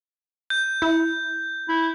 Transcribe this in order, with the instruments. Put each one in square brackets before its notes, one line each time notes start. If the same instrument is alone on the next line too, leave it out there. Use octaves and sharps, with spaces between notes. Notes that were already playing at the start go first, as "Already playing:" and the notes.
[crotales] G6
[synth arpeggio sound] E4
[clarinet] E4